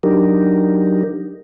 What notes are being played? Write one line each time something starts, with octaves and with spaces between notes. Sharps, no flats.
F#3 D4 D#4 G4 A#4